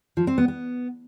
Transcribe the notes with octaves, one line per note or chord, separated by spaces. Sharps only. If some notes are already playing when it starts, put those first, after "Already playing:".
F3
C4
B3
B3